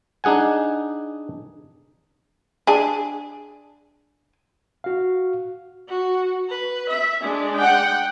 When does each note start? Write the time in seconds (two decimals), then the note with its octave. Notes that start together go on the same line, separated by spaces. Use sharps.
0.24 D4 D#4 G#4 F#5 G#5
2.67 D4 G#4
4.84 F#4 F5
5.88 F#4
6.49 B4
6.90 E5
7.22 G#3 D4
7.57 F#5 G5